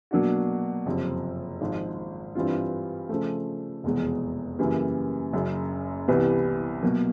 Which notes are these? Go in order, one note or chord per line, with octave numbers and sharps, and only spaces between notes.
B2 F#3 A#3 D4 F#4
F#1 F2 C3 F3
G#1 G#2 F3
G2 E3 G3 C4 F4
C#3 F3 A3
F1 E2 B2 G#3
F#2 C#3 E3 G3 A#3
F#1 F#2 C#3
C2 C3 E3 G3 B3
B2 F#3 A#3